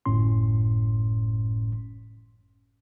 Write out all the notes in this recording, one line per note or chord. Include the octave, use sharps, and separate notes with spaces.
G1 F#2 A2 C#4 C6